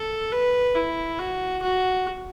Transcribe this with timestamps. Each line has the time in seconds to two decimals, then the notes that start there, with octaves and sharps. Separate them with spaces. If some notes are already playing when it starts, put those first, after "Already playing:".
Already playing: A4
0.32 B4
0.75 E4
1.19 F#4
1.62 F#4